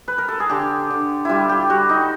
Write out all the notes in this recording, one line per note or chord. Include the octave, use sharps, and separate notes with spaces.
B4
A#4
A4
G#4
D3 G4
D3
G3 E4 F4
G4
G3 F#4
D#4